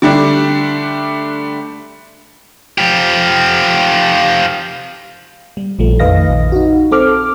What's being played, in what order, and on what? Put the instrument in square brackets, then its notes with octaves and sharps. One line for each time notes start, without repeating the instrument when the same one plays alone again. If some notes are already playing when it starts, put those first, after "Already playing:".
[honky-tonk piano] D3 G3 A3 D4
[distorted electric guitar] F3 G4
[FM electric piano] G3
A#1 F3 G3 A3
F2 D#3 B4 D#5 F5 A#6
A#1
D#4 F#4
C4 A4 D6 F6